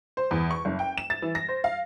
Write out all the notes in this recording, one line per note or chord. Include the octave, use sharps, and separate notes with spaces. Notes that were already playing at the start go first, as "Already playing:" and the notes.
C5
E2
C#6
F#1
G5
E7
A6
E3
A#6
C5
F5